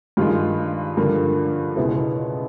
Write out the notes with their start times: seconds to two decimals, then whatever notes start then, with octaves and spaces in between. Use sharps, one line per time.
0.17 G2 D#3 G#3 F4
0.97 G2 D3 F3 A#3
1.77 C#2 B2 G#3 B3 E4